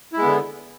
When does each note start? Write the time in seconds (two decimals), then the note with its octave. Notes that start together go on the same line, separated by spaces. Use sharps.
0.13 E4
0.17 G#3
0.21 B3
0.26 D3